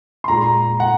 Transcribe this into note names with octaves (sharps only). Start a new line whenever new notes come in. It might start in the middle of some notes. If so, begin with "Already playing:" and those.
C6
A#2 G#3 A#5
F#5